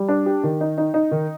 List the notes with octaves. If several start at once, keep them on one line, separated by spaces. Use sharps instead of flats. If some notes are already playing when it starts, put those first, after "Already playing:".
Already playing: G3
D4
G4
D#3
D#4
D#4
D#4
D#3